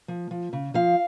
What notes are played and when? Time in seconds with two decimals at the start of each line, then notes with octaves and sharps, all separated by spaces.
0.08 F3
0.31 F3
0.53 C#3
0.74 F3 F5